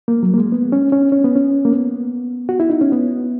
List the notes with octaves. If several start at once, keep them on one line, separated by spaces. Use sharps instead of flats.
A#3
F#3
A#3
G#3
B3
C#4
C#4
C#4
B3
C#4
A#3
B3
F#4
E4
D#4
C#4
B3